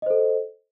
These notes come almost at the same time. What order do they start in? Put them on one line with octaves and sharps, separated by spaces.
D#5 C5 A4